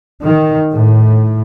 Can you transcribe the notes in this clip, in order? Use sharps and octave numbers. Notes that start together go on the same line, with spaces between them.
D#3
A2